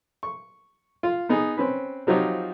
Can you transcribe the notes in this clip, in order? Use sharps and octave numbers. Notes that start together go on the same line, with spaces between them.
C#6
F4
B3 D#4 G#4
C4 C#4 B4
F3 F#3 C4 D#4 F4 G4